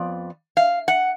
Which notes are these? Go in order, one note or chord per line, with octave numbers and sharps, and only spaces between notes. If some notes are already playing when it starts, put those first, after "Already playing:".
Already playing: F2 F3 B3 D5
F5
F#5